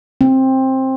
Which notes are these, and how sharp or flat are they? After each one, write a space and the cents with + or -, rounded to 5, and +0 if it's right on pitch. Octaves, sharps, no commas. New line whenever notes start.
C4 +15